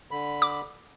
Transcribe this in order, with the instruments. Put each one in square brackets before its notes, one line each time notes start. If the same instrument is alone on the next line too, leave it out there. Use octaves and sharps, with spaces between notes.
[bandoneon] D3 B5
[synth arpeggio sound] D6